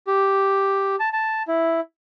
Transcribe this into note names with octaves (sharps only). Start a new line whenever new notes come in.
G4
A5
A5
E4